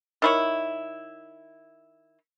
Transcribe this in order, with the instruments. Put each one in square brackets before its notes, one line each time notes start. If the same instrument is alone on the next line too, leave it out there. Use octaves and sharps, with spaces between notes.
[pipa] D#3 E4 C#5